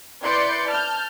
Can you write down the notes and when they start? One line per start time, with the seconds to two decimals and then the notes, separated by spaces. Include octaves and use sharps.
0.23 E4 B4 D5 C6 G6 C#7
0.68 A5 F6 G6